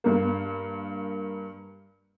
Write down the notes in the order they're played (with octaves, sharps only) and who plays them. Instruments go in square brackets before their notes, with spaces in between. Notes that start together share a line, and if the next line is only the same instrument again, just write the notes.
[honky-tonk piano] G2 A#3